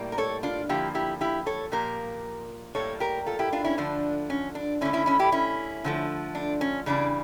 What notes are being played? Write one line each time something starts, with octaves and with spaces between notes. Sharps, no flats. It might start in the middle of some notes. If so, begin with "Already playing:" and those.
Already playing: A2 G3 A#3
A#4
A4 C#5
D4 F4
D3 F3 A#3 E4 G4
E4 G4
E4 G4
A4 C#5
A#2 F3 A#3 G4 A#4
A2 G3 A#3 A4 C#5
G4 A#4
F4 A4
E4 G4
D4 F4
C#4 E4
D3 F3 A3 D4
C#4
D4
D3 A3 C#4 E4
C#4 E4
C#4 E4
E4 G4
C#4 E4
D3 F3 A3
D4
C#4
C#3 E3 G3 D4